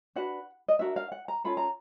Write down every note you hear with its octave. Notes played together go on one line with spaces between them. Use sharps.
D4 F#4 B4 F#5
D#5
D4 F#4 A#4 E5
F5
F#5
A#5
C#4 F4 A4 B5
A#5